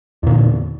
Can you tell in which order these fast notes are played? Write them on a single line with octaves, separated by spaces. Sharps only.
E2 A#2 D3